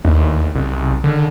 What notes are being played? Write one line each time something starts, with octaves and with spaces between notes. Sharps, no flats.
D#2
C2
D3